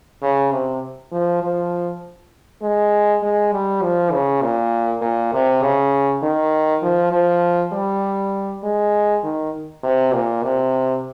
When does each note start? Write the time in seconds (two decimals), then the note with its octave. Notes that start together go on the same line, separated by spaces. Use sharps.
0.22 C#3
0.52 C3
1.12 F3
1.42 F3
2.62 G#3
3.22 G#3
3.52 G3
3.82 F3
4.12 C#3
4.42 A#2
5.02 A#2
5.33 C3
5.62 C#3
6.22 D#3
6.82 F3
7.12 F3
7.72 G3
8.63 G#3
9.23 D#3
9.83 C3
10.13 A#2
10.43 C3